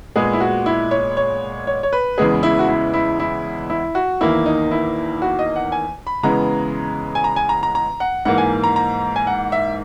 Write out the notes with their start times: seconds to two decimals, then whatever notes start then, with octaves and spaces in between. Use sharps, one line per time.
0.16 A#2 G#3 B3 G#4
0.33 E4
0.40 F#4
0.66 E4
0.91 C#5
1.17 C#5
1.67 C#5
1.83 C#5
1.93 B4
2.18 E2 C#3 E3 G#3 B3 G#4
2.43 E4
2.59 F#4
2.68 E4
2.94 E4
3.20 E4
3.70 E4
3.95 F#4
4.21 E2 D#3 A#3 E4
4.46 D#4
4.71 E4
5.22 F#4
5.39 D#5
5.56 F#5
5.72 G#5
6.07 B5
6.23 C#3 E3 G#3 B3 A#5
7.15 G#5
7.24 A#5
7.36 G#5
7.49 A#5
7.63 A#5
7.75 A#5
8.00 F#5
8.25 G#2 E3 A#3 F#5
8.38 G#5
8.64 A#5
8.76 A#5
9.16 G#5
9.27 F#5
9.52 E5